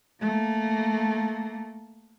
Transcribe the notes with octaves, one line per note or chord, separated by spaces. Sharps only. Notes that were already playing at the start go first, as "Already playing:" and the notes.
A3 A#3